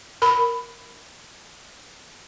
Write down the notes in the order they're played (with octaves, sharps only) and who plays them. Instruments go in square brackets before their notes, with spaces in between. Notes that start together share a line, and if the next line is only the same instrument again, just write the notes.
[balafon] A#4 B5